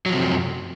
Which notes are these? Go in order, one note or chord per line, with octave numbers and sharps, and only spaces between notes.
F#2 C3 F3 F#3